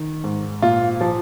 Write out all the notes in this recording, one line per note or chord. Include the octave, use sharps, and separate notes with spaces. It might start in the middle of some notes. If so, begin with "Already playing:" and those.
Already playing: D#3
G#2
A#2 F4
F3